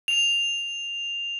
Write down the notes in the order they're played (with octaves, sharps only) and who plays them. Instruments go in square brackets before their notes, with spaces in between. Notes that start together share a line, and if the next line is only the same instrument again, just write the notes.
[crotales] F7